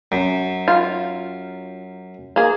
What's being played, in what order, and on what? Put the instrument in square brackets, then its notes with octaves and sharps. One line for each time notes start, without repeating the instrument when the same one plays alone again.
[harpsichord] F#2
[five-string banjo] F4
A#3 G#4